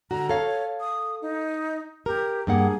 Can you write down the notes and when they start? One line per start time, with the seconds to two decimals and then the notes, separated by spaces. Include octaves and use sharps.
0.11 D3 F#4 A#5
0.29 A4 C#5 F5
0.80 D#6
1.22 D#4
2.06 G4 A#4
2.47 G2 A#3 G#4 F#5